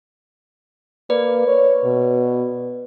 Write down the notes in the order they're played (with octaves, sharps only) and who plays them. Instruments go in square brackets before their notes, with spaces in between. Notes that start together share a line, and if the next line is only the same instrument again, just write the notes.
[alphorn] A#3 [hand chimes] B4 D5
[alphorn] C#5
B2